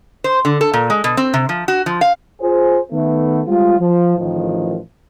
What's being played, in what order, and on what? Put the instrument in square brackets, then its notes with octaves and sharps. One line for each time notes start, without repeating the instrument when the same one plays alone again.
[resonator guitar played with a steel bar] C5
D3
A4
A#2
G#3
B2
C4
C3
F3
F#4
F3
F5
[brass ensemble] F4 G#4 C5
D#3 A3 B3
G3 G#3 C4 F4
F3
A1 D#3 F3